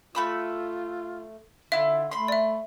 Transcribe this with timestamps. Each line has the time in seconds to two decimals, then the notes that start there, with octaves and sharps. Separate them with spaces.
0.15 A3 F4 B5 E6
1.72 D3 E4 F4 E5
2.11 A3 B5 C6
2.28 D5 E5